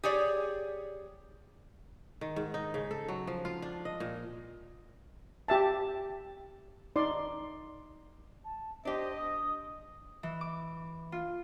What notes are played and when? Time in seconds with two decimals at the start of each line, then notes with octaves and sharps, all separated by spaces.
0.04 G4 G#4 C#5 D5
2.21 D#3
2.36 G#2
2.54 D#4
2.74 C#3
2.91 A4
3.08 F#3
3.27 F3
3.45 F4
3.62 D4
3.85 D#5
4.00 A#2
5.48 G4 E5 A5
6.96 D#4 D5 C6
8.45 A5
8.85 D4 G4 C5 D#5
9.17 D#6
10.23 E3
10.41 D6
11.12 F4